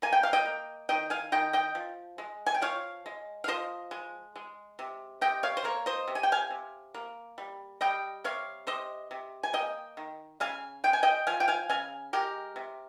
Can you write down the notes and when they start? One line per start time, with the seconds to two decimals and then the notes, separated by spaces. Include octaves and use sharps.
0.02 A#3 G#5
0.12 G5
0.23 F5
0.33 D#5 G5
0.45 A#3
0.89 D#3 D#5 G5
1.10 F5 G#5
1.32 D#3 D#5 G5
1.53 D#5 G5
1.75 F3
2.18 G#3
2.46 G#5
2.54 G5
2.62 F3 C#5 F5
3.06 G#3
3.44 F5
3.48 F3 C5 D#5
3.91 G#3
4.36 G#3
4.79 C3
5.21 C3 D#5 G5
5.43 C#5 F5
5.57 C5
5.64 A#3 A#4 C#5
5.86 C5 D#5
6.08 C3
6.15 G#5
6.23 G5
6.32 F5 G#5
6.51 C3
6.94 A#3
7.38 G3
7.81 G3 D#5 G5
8.24 C3 C#5 F5
8.67 C3 C5 D#5
9.11 C3
9.43 G#5
9.53 A#3 D#5 G5
9.97 D#3
10.40 C#3 F5 G#5
10.84 G#3 G5
10.93 G#5
11.03 D#5 G5
11.27 F3 F5 G#5
11.40 G5
11.48 F5 G#5
11.69 C#3 F5 G#5
12.13 G#3 G4 A#4
12.56 C3